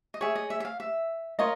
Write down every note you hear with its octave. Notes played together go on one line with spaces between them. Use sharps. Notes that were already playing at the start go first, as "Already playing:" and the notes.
D#5
G#4 C#5 E5
D#5
E5
E5
F5
E5
F4 A#4 C#5 D#5